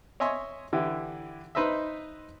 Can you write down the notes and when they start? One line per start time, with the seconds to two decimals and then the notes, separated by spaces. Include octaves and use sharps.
0.20 C#5 D#5 E5 G#5 C6 C#6
0.73 D3 E3 E4 G4
1.55 D#4 B4 C5 D#5 E5